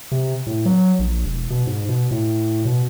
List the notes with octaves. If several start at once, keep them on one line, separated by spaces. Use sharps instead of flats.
C3
A2
F#3
A#1
E1
B2
G#2
B2
A2
B2